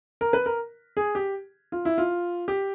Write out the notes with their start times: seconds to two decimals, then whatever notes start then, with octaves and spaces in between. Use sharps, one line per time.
0.21 A#4
0.33 B4
0.46 A#4
0.97 G#4
1.15 G4
1.72 F4
1.85 E4
1.98 F4
2.48 G4